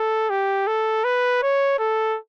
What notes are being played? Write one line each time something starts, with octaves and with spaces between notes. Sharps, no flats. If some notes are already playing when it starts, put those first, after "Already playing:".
Already playing: A4
G4
A4
B4
C#5
A4